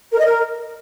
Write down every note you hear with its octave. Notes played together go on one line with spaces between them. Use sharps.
A#4
D#5
A#4